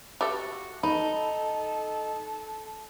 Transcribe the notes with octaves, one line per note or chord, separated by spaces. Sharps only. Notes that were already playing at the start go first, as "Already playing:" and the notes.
F#4 G4 A4 E5
D#4 A4 B5